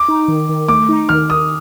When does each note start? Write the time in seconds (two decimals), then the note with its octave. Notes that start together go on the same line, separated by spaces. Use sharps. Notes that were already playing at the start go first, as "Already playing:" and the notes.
Already playing: D6
0.08 D#4
0.28 D#3
0.49 D#3
0.68 A3 D6
0.89 D#4
1.09 D#3 F6
1.29 D#3 D#6